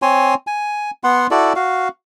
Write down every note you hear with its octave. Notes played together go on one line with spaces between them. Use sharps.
C4 C#5 G#5 C6
G#5
B3 F#5 C6
E4 F#4 A4 D5
F#4 F5